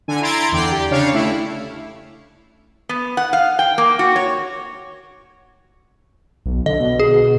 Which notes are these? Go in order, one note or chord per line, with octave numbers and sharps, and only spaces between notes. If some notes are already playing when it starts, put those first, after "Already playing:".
D3 G#5
E4 A#5 C6 G#6 A6 D7
E2 D3 D5 G5 A#5 C7
G4
C#3 D4 C#5 F5
A3 E4
B3
F#5
F5
G5
A#3
F#4
C#5
B1
D3 D#5
B2
G#4